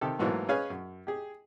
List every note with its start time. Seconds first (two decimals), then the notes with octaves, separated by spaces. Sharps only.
0.01 C3 D#3 G4 A4
0.19 G#2 E3 F#3 A3 A#3
0.49 C#4 G#4 B4 C#5 F5 G#5
0.70 F#2
1.07 G4 G#4